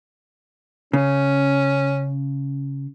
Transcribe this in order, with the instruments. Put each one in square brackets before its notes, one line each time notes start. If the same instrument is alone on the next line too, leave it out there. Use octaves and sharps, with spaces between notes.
[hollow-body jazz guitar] C#3 [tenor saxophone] C#4